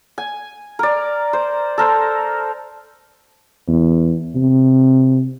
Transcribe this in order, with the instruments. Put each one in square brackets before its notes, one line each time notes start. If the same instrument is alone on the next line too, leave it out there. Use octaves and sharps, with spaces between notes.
[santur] G#5
A#4 D5
C5
A4 A#4 C5
[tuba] E2
C3